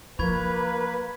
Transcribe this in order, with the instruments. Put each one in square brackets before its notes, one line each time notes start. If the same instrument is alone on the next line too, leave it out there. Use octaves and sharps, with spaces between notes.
[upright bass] F3 F4 [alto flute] A#3 [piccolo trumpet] B4 [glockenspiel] B5 C#6 G#6